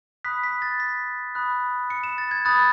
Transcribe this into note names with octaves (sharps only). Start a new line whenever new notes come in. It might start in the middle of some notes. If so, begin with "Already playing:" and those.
B5 D#6 F#6 B6
B6
A6
B6
B5 D#6 F#6
C#7
E7
A6
G#6
B5 D#6 F#6 A6